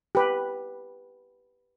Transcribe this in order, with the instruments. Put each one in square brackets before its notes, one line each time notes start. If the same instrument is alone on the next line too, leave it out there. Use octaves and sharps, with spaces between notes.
[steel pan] G4 B4